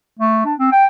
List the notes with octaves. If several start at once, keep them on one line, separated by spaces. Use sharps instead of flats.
A3
D4
C4
G5